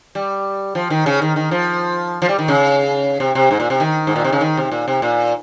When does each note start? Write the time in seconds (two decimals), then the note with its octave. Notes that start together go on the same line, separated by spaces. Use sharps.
0.15 G3
0.75 F3
0.90 D#3
1.06 C#3
1.22 D#3
1.36 D#3
1.51 F3
2.22 F3
2.29 G3
2.39 D#3
2.48 C#3
3.20 C3
3.35 C3
3.51 G#2
3.60 A#2
3.70 C3
3.80 D#3
4.07 G#2
4.16 A#2
4.24 C3
4.33 C#3
4.41 D#3
4.57 C3
4.72 A#2
4.88 C3
5.02 A#2